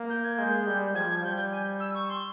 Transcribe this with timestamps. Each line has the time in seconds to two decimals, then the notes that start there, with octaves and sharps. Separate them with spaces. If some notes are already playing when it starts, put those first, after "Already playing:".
Already playing: A#3
0.10 G6
0.24 G#6
0.38 G#3 G6
0.67 G3
0.94 F3 G#6
1.23 G3 G6
1.37 G6
1.52 G#5
1.80 E6
1.95 C#6
2.09 C6